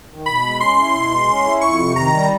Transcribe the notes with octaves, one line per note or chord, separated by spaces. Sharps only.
D#3
B2 B5
G#3
C#4 C6
E4
B2
G#3
C#4
E4
F2 C#6
C3
D#3 A#5
G3